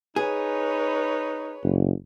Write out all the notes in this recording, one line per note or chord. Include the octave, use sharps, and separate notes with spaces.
D#4 G#4 B4 C#5
F#1